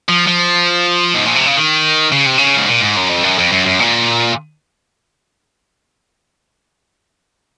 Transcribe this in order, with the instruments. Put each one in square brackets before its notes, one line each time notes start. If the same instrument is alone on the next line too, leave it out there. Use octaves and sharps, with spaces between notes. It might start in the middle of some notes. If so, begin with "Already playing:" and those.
[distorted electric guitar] F3
F3
G#2
A#2
C3
C#3
D#3
C#3
C3
C#3
G#2
A#2
G#2
F#2
F2
F#2
F2
F#2
F#2
A#2